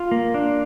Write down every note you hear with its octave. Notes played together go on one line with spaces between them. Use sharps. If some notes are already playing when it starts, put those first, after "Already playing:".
Already playing: F4
A#3
D4